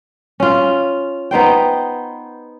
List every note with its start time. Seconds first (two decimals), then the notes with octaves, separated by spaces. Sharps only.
0.40 C#4 F4
1.31 B3 D#4 C5 G5